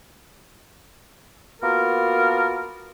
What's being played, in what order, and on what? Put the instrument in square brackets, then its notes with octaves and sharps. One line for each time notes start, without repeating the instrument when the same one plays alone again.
[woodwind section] A#3 B3 F4 F#4 A#4